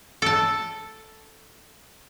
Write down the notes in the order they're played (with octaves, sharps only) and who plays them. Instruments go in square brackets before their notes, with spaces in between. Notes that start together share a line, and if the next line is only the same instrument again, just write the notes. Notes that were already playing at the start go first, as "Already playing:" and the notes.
[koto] A4 A5